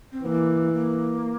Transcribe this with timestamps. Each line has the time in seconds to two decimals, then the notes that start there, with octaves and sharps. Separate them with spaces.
0.12 C4
0.24 E3 A#3
0.73 A#3